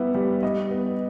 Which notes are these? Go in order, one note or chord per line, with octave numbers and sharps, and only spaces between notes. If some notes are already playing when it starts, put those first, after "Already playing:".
Already playing: G3 B3 E4 E5
G3
G3 D#5
B3